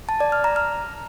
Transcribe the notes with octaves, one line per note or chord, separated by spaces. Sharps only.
A5
D5
F6
A#5
F6